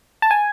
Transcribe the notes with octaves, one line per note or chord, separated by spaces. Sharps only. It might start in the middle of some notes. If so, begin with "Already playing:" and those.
A5
G#5